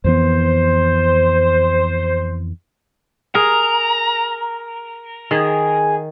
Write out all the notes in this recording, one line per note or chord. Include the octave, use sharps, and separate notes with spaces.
F2 E3 B3 C5
G#4 A#4 A#5
D#3 G#4